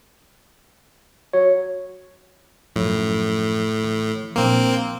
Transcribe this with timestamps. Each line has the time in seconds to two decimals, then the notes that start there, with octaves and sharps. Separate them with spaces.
1.33 F#3 C#5
2.76 F#2 A2 F3
3.84 E3
4.36 A#1 A#3 C4